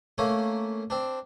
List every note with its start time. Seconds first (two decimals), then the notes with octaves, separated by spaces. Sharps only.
0.18 A3 A#3 C#4
0.90 C4 D4